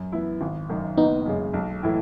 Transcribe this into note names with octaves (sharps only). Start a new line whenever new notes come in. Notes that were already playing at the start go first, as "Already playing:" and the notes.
Already playing: F#2
E3 B3 E4
G#1
F#2 D#3
F#1 B3 D#4
F#2 C#3 G#3
B1
A2 E3 A3 E4